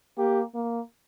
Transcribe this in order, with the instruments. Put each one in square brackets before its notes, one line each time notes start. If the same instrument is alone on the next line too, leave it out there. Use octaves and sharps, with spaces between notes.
[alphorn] A#3 [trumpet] G4
[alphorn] A#3